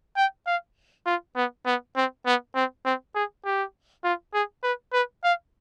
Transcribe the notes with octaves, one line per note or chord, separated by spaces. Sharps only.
G5
F5
F4
B3
B3
C4
B3
C4
C4
G#4
G4
F4
G#4
B4
B4
F5